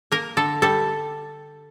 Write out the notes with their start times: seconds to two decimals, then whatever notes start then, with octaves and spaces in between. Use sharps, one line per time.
0.12 A#3 A#4
0.37 D3 A4
0.62 G3 A4